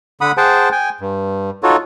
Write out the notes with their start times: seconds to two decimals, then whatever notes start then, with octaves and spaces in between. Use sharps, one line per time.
0.21 D3 F#5 B5 D#6
0.37 G#4 C5 F#5 G5 A5
0.72 G5 G#5
1.01 G2
1.63 D#4 F4 F#4 A4 C#5